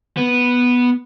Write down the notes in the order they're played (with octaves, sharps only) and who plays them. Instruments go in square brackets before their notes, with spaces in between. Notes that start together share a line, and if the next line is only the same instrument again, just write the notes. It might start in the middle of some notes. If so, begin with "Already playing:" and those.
[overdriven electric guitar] B3